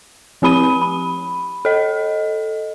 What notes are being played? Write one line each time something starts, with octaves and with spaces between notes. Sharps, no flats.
F3 C4 G4 B5 D#7
B5
A4 D#5